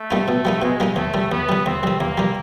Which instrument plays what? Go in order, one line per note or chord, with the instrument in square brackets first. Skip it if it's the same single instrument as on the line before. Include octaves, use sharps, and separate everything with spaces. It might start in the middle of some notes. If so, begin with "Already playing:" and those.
Already playing: [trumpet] A3
[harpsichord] G3 A#3 D#4
B2
G3 A#3 D#4
[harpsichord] B2 [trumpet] G#3
[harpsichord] G3 A#3 D#4
[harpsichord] D#2 [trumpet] A3
[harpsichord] D#3 G3
[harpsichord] D#2 [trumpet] B3
[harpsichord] D#3 G3
[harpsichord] D#2 [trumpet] C4
[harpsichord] D#3 G3
[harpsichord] D#2 [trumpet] A#3
[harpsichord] D#3 G3